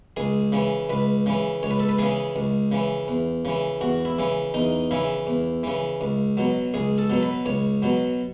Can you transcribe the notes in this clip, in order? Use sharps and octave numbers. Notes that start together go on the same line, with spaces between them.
C#2 G#4
C#3 E3
C#2 B4
C#3 E3
C#2 C#5
B4
A4
B4
C#3 E3 G#4
C#2
C#3 E3
E2
C#3 E3
E2 F#4
E4
C#3 E3
E2 D#4
C#3 E3 E4
E2
C#3 E3
C#2
B2 F#3
C#2 G#4
A4
B2 F#3
B4
C#2 C#5
B2 F#3